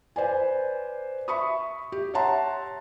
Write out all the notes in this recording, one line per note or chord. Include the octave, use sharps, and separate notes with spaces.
B4 C5 D5 G#5
E5 B5 C#6 D#6
G4
C#5 E5 F#5 A5 A#5 C6